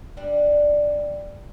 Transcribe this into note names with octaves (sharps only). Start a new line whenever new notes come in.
G3 D4